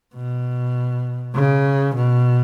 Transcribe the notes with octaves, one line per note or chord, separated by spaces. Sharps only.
B2
C#3
B2